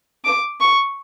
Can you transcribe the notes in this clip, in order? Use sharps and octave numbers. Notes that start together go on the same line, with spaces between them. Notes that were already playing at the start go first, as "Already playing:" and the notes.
D6
C#6